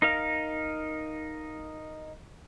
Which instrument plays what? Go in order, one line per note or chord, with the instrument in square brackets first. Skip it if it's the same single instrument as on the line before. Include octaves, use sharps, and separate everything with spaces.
[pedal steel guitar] D#4 A#4 F5